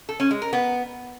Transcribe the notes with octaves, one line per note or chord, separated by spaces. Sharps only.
A4
C#4
G#3
A#4
B3